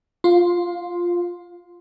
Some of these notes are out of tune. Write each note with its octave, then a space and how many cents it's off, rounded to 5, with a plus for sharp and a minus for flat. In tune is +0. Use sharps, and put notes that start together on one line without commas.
F4 +0 F5 +30 C6 +0